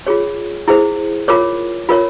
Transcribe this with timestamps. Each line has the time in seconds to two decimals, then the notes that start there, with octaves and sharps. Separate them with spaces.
0.07 F4 G#4 C#5
0.68 E4 G#4 C5
1.28 F4 A#4 C#5 D6
1.89 F4 A#4 C#5